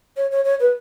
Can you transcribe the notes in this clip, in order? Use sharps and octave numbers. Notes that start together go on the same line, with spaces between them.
C#5
C#5
C#5
B4